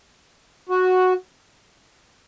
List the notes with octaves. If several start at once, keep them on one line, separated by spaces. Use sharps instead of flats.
F#4